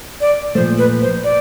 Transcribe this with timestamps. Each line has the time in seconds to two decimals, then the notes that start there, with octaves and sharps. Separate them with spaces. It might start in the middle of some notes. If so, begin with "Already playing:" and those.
0.21 D5
0.55 A#2 F3 A3 C5
0.78 B4
1.01 C5
1.24 D5